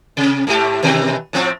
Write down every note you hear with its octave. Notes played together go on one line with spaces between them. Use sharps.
C3
G#2 A3 G4
B2 D#3 E3
A2 F3 C4